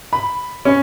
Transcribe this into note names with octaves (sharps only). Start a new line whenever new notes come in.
B5
C#4